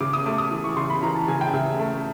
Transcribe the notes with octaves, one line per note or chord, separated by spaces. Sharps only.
C#3 D6
D#6
A3 D6
D#6
E3
C#6
C#3 C6
B5
E3 A#5
A5
C#3 G#5
G5
C#3 E5
A3